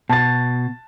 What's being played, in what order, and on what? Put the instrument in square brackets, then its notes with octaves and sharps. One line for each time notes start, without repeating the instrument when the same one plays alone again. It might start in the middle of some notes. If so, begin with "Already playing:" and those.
[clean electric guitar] B2 [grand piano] A5 A6